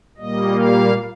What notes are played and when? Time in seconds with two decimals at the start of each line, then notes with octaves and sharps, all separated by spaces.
0.17 A#2 G3 A#3 D#5
0.54 F5